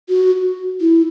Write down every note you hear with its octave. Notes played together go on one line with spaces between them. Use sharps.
F#4
E4